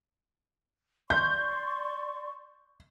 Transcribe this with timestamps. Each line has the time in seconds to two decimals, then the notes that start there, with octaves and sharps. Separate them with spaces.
1.10 D5 C6 C#6 G6